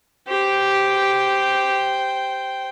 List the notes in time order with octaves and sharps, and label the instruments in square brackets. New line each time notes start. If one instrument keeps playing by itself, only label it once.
[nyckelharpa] G4 [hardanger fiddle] C5 G5